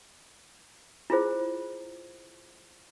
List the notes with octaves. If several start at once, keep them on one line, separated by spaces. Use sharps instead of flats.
E4 F4 G#4 C5